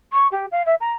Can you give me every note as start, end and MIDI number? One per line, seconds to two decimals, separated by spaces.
0.13 0.27 85
0.32 0.46 67
0.52 0.62 77
0.66 0.75 76
0.80 0.93 82